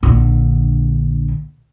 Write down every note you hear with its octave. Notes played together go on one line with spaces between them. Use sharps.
A#1 D3